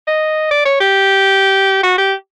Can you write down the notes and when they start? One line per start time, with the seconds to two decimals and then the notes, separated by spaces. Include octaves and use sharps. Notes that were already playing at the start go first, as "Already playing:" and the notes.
0.08 D#5
0.51 D5
0.66 C#5
0.81 G4
1.83 F#4
1.98 G4